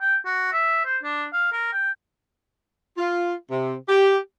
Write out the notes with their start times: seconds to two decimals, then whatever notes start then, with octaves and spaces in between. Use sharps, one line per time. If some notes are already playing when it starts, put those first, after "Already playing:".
0.01 G5
0.26 F#4
0.53 E5
0.85 C5
1.03 D4
1.33 F5
1.53 A#4
1.73 G5
2.98 F4
3.50 C3
3.89 G4